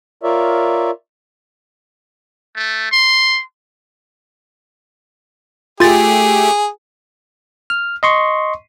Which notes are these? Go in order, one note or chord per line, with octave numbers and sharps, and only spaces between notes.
F4 A#4 C#5 D5 E5
A3
C6
A3 F4 G4 G#4 A6
F6
D#5 C6 C#6